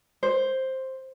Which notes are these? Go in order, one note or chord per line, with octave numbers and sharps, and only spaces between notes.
C5